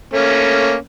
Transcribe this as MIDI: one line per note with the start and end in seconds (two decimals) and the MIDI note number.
0.13 0.75 57
0.13 0.75 58
0.13 0.75 61